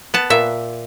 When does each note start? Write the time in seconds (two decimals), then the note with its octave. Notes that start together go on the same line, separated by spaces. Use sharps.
0.14 B3 A5
0.30 A#2 E5